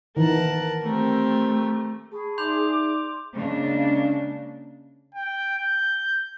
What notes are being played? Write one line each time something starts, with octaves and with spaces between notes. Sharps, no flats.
D#3 E3 A#4 F#5 A5
A3 C4 G4 A#4
G#4 A5 B5 C#6
D#4 D5 E5 C6 D6 G6 F7
C#3 G#3 A#3 D4
G5
G6